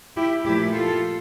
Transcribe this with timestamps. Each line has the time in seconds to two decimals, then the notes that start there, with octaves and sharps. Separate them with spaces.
0.16 E4 G4
0.45 A#2 F3 A3 E4 G4
0.73 F4 A4